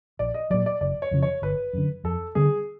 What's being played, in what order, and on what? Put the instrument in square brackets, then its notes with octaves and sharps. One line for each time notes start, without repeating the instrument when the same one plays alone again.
[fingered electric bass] A#1 [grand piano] D5
[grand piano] D#5
[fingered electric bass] A#2 F#3 [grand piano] D5
[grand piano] D5
[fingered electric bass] F#1 [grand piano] D5
[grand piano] C#5
[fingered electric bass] F2 C#3 F3
[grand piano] C#5
[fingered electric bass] G1 [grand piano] B4
[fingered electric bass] F#2 D3
[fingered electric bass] F2 [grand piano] A4
[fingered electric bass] D3 G3 B3 [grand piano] G#4